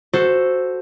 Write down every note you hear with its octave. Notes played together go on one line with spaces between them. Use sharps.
F#4 A4 C5